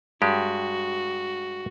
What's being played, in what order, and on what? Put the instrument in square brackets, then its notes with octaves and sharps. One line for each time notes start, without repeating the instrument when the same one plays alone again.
[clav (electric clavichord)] G2 G#3 G4 [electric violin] F#4